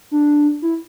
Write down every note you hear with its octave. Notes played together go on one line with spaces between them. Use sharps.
D4
E4